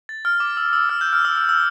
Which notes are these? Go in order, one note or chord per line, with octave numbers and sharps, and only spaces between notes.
A6
F6
D6
E6
E6
F6
G6
F6
E6
E6
E6